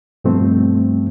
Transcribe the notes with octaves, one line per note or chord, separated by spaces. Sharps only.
G2 B2 F3 G3 A3 C4